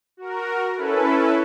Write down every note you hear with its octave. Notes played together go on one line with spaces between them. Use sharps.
F#4 A#4
C#4 E4 A4 B4